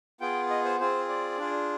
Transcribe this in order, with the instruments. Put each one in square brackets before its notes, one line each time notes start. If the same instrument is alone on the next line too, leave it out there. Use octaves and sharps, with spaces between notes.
[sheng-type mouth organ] B3 F4 G#4 G5
D#5
C5
C4 F4 G#4 C5
D5
D4 F4 G#4